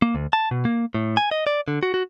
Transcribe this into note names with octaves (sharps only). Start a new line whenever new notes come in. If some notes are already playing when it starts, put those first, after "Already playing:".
A#3
D2
A5
B2
A#3
A2
G#5
D#5
D5
D3
F#4
F#4